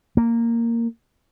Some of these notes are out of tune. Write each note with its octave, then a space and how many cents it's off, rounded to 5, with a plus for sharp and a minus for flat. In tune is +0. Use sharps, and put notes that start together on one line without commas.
A#3 -10